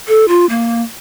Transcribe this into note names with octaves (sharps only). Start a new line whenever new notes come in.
A4
F4
A#3